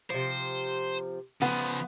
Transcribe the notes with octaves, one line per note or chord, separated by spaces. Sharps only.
C3 F3 C5
C#3 F3 B3